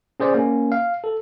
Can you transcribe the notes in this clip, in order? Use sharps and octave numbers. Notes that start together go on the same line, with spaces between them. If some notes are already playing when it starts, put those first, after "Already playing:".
C#4 G#4 C5 D5
A#3 C#4
F5
A4